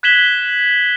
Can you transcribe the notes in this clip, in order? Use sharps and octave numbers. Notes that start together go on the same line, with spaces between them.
F#6 G#6 B6 E7 F#7 G7